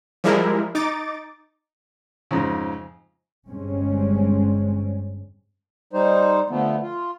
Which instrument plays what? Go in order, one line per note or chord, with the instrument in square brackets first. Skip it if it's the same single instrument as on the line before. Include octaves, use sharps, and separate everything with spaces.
[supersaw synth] F3 G3 G#3 E4 A#4
D#4 D6 A6
[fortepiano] F2 G#2 C#3
[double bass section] G1 G2 G3 G#3 C4 C#4
[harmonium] G3 D#4 C5
D3 F3 A3 B3
F4